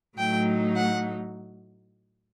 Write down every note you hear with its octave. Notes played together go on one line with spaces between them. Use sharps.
A2 F#3 A3 D#4 G5
F#5